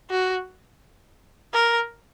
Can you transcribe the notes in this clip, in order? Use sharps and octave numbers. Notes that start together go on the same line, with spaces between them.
F#4
A#4